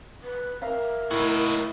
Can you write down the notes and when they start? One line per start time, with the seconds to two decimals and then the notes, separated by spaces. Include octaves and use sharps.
0.23 B4
0.62 A#4 E5 F5 A#5
1.11 A2 D#4 F#4